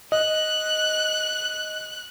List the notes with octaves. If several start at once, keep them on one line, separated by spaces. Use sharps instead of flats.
D#5 F#6